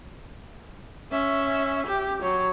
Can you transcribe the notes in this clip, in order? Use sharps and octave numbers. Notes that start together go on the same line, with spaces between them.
C#4 E5
G4
F#3 C#5